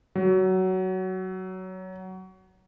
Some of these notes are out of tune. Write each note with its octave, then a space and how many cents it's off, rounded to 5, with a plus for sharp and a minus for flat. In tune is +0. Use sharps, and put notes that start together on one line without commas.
F#3 +15